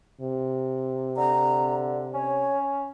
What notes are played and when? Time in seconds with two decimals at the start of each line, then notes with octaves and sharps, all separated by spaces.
0.21 C3
1.17 D3 A#5
2.14 C#4 C#5